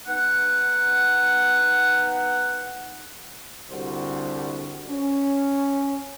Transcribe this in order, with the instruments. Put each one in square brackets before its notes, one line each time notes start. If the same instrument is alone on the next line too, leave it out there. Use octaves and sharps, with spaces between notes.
[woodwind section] B3 D#4 F#5
[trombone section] C2 D3 G3 F#4 C5
C#4